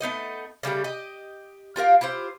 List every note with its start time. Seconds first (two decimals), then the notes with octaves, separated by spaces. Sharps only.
0.01 A3 B3 D#4 D#5
0.63 C#3 G3 A3 G4
0.84 G4 D#5
1.76 F4 G4 A#4 F5
2.01 E4 F4 G4 C5